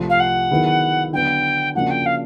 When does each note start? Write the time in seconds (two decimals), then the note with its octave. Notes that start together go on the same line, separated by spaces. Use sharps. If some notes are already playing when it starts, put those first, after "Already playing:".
Already playing: C2 C3 F3 A3
0.09 F5
0.19 F#5
0.51 D#3 F#3 B3 E4 G#4
1.13 D3 F#3 B3 G5
1.75 C#3 F3 A#3 D4 F#4 F#5
1.90 G5
2.05 F5